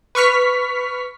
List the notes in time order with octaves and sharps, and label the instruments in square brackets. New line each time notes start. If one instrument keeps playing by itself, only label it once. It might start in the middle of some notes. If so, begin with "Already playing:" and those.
[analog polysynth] B4 C#6 F6 B6